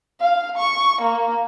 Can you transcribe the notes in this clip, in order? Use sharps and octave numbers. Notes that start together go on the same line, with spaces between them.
F5
C#6
A#3